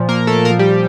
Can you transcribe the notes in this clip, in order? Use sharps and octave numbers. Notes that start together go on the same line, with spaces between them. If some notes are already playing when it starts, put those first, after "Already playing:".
Already playing: A#2 F3
A#3 A#4
A3 A4
A#2 A#3 A#4
F3
G3 G4